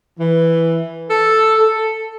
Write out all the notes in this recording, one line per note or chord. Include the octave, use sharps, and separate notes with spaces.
E3
A4
A4